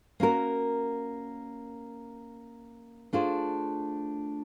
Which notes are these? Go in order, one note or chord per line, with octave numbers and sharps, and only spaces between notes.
A#3 C#4 F#4 A#4
A3 D4 F4 G#4 C5